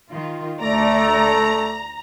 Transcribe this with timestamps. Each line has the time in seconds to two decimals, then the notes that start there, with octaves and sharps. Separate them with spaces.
0.10 D#3 F4
0.61 D2 A3 D5 A#5